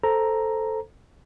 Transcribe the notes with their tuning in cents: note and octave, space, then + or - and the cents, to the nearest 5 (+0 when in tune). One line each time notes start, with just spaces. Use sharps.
A4 +0 C5 +0 A#5 +0